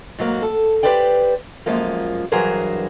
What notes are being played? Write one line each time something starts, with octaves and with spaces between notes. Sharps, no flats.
G#2 F#3 A#3
A4
G4 A4 B4 C5 D5 G5
F#2 F3 G#3 A#3
G2 E3 F#3 G#4 A#4 C5